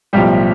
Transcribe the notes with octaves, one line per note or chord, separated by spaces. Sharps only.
B1 A2 F3 G3 G4